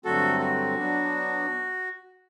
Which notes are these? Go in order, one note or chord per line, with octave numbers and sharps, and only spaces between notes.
G2 D3 F#3 A3 C4 F#4 A4
F#4
F#3 B3 D4